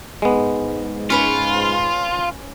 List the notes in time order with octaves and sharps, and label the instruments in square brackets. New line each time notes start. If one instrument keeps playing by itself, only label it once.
[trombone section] G#2 [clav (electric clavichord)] G#3 B3
[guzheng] C#4 B4 C#5 [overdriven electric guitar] F4